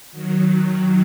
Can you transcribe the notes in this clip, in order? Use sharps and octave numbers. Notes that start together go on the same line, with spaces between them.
D#3 F#3